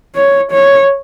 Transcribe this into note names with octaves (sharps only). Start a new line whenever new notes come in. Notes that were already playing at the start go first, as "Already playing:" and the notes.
C#5
C#5